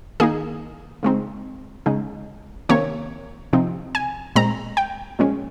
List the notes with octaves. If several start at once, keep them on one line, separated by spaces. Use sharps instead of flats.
D#3 A#3 D#4 G#4
C#3 G#3 C4 D#4
C#3 G#3 D#4
C3 D#3 A#3 C#4 C#5
C3 F3 C4 D#4
G#5
A#2 G#3 C4 A#5
G5
A#2 F3 G#3 C#4